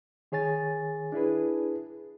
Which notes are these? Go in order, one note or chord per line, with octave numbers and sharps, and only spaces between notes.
D#3 G#4 C#5 G#5 A6
D4 E4 G#4 B4